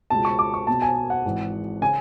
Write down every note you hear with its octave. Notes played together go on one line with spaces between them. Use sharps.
C#2 B2 A5
C#6
D6
C#6
B1 B2 A5
G#5
F#5
G#1 G#2 E3
C#3 G#5